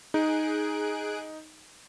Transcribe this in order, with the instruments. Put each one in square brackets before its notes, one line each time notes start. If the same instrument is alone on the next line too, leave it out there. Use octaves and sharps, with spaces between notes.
[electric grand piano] D#4 [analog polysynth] G#4 F#6 D7